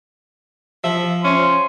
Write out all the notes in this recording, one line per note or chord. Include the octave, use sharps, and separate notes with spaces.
F3 E5
C#4 C6